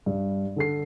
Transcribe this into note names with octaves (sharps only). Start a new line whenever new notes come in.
G2
D3 A4 C7